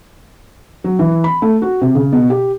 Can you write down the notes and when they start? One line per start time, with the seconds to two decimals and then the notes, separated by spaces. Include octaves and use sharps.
0.84 F#3
0.99 E3
1.24 B5
1.42 A3
1.62 F#4
1.81 C3
1.95 C#3
2.13 B2
2.30 G4